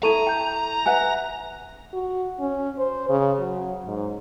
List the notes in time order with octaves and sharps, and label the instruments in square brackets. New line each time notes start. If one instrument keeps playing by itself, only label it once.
[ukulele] E4 A5 [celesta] A4 C#6 D#7 [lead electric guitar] A#5
[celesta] G5 G6
[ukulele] B4 E5 F#5 [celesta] G#5 F#6
[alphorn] F#4
C#4
C5
C#3
F#3
G#2